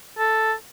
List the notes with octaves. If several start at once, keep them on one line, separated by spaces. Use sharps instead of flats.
A4